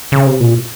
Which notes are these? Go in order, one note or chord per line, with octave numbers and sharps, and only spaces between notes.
C#3
C3
A#2